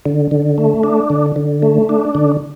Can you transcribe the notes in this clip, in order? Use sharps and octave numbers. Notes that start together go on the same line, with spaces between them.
D3
D3
A3
D4
D3
D3
A3
D4
D3